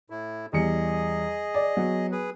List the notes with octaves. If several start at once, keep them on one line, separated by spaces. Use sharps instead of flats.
A2 E4
E2 G3 G#4 D#5 C#7
D5
F#3 B3 F#4
G#4 B4